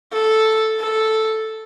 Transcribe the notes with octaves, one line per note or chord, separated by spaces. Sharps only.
A4
A4